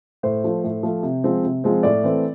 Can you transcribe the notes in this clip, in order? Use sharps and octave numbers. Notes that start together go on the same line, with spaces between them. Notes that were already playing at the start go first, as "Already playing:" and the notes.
A2 C5
F3 A3
A2
F3 A3
C3
F3 G#3 C4
C3
F3 G#3 C4
A2 D5
E3 A3 C4